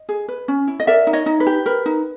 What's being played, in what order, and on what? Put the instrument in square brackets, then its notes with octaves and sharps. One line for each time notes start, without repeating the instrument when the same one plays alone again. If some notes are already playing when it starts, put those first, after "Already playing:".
Already playing: [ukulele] D#5
G#4
B4
C#4
E4
D#5
A#4 D5 E5
D#4
C#5 D#5
D#4
B4
G4
A#4 B4
D#4